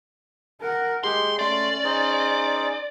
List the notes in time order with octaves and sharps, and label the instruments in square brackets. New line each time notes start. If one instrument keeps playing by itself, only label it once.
[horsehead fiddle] A#4 F#5
[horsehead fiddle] G#3 G4 [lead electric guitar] C6
[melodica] A3 C6 [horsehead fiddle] C#4 [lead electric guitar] D5
[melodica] D#4 G#4 C5